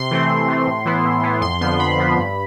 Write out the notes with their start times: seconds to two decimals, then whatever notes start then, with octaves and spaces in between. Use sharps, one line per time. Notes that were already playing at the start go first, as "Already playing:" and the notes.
Already playing: C3 C6
0.11 E3 A3 C4
0.29 C3
0.48 E3 A3 C4
0.67 A2
0.85 E3 B3 E4
1.05 A2
1.23 E3 B3 E4
1.41 F2 C6
1.61 D3 F3 B3 C6
1.79 F2 B5
1.98 D3 F3 B3
2.17 G2